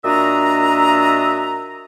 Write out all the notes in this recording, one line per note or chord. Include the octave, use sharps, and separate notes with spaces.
A#2 D4 F#4 D#5 E5 A#5